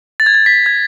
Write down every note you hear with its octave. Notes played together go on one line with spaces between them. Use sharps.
A6
G#6
A6
B6
G#6